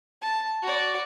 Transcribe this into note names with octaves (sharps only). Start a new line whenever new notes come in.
A5
F#4 D5